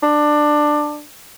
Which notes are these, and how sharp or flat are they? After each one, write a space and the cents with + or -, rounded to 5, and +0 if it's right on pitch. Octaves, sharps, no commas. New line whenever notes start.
D4 +15